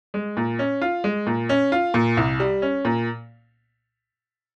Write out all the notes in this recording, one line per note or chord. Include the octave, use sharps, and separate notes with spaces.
G#3
A#2
C#4
F4
G#3
A#2
C#4
F4
A#2
C2
G3
C#4
A#2